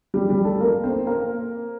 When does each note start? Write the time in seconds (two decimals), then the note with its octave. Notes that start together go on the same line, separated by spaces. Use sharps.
0.14 G3 G4
0.29 G3 G4
0.44 A3 A4
0.60 A#3 A#4
0.84 C4 C5
1.06 A#3 A#4